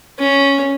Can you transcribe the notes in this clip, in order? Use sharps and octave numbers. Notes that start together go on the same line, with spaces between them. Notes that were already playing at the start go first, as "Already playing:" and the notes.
C#4